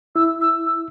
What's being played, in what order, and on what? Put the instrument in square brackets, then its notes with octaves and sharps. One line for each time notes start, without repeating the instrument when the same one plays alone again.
[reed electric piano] E4 [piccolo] E6
[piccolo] E6
E6